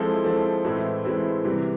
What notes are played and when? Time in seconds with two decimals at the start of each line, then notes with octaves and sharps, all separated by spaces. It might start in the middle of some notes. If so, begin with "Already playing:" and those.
Already playing: F3 G#3 C4 E4 A4
0.24 F3 G#3 C4 E4 A4
0.65 A2 E3 G#3 C4 E4
1.05 A2 E3 G#3 C4 E4
1.45 C3 E3 G3